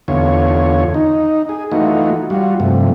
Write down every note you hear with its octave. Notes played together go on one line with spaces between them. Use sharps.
E2 D3 F4 C#5
D#4
G#4
E3 A3 D#4 F4 F#4
G3 F4 F#4
G2 C3 F3 A3